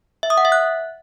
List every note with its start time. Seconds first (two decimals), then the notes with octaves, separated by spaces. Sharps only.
0.23 E5
0.30 D#6
0.37 F#5
0.45 E5
0.52 F#6